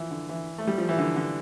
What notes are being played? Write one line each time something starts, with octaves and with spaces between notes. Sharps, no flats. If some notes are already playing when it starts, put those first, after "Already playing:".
Already playing: E3 F3
D3
E3
A3
G3
F3
E3
D3
D3